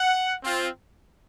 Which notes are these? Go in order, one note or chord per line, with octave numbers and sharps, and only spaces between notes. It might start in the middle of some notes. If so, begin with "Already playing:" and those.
Already playing: F#5
C4 F4